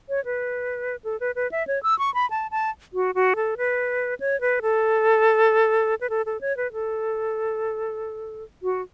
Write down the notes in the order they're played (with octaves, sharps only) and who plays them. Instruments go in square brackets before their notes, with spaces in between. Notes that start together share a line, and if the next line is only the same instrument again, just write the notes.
[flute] C#5
B4
A4
B4
B4
E5
C#5
E6
C#6
B5
A5
A5
F#4
F#4
A4
B4
C#5
B4
A4
B4
A4
A4
C#5
B4
A4
F#4